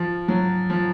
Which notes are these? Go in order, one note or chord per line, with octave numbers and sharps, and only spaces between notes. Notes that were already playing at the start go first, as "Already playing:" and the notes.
Already playing: F3
F#3
F3